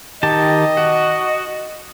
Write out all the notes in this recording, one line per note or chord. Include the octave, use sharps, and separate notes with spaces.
D#3 G4 D#5 A5
F#4